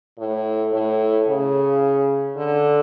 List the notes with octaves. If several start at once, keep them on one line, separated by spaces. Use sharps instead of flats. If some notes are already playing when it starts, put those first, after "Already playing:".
A2
A2
C#3
D3